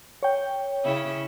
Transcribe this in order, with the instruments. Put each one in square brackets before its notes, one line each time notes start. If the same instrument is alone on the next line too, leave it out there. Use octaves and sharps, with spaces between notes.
[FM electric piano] C#5 G5
[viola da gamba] C#3 C#4 E4